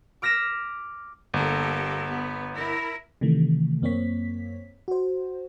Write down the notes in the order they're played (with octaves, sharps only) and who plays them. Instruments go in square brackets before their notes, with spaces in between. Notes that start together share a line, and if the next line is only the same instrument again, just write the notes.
[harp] D6 F6 A#6 B6 E7
[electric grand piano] G1 [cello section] A#3 G4 A4
[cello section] B3
E4 A#4
[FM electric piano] C3 D#3 E3 A3
F#2 A#3 C4 C#5 B6
F#4 C5